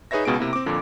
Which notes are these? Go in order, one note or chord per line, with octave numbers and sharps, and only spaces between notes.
D#4 G#4 B4 C#5 E5 A#6
C#2 B2 B3 G#4 D7
C3 A#3 E4
C4 D6
F2 A#2 D3